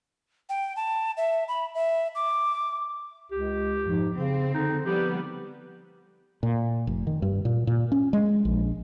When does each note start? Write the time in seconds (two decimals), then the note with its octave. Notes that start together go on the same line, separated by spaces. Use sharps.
0.49 G5
0.76 A5
1.17 E5
1.48 B5
1.75 E5
2.15 D6
3.32 C#2 G4
3.84 F2 G#2
4.16 C#3 C4
4.54 D3 D#4
4.86 F3 G3 B3 G4
6.43 A#2
6.87 F1
7.07 D#3
7.22 G2
7.45 A#2
7.67 A#2
7.92 C#4
8.13 G#3
8.45 A#1